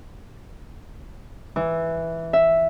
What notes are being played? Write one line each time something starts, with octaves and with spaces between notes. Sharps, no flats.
E3
E5